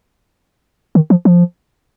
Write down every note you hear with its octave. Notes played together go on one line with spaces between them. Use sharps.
D#3
F3
F3